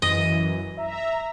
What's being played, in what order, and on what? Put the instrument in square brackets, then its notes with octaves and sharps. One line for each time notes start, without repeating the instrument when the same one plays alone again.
[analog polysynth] F#2 E3 [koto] D#5
[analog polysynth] E5 A#5